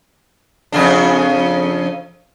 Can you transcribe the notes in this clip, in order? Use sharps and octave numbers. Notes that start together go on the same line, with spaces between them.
F2 C#3 D4